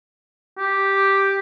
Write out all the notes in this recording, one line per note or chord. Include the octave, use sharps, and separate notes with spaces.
G4